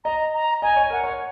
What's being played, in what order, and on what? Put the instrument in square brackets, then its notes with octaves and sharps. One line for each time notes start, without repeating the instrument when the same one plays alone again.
[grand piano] D#5 [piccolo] A#5
[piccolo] A#5
[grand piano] D#5 [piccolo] G#5
[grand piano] C#5
[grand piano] A#4 [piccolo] F#5
[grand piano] C#5